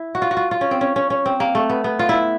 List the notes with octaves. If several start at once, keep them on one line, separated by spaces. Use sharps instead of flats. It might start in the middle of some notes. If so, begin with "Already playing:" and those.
Already playing: E4
F#4
F4
F#4
F4
F4
C#4
C4
C#4
C#4
C#4
C4
A#3
A3
B3
B3
F4
E4